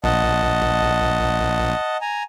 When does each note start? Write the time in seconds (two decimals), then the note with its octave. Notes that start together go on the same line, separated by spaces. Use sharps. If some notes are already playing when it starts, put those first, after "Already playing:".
0.04 A#1 D#5 F#5 A5
2.01 G#5 A#5